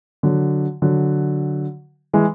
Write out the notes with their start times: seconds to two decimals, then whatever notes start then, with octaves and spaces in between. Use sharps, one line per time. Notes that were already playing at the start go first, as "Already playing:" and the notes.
0.23 D3 F#3
0.82 D3 F#3
2.13 E3 G#3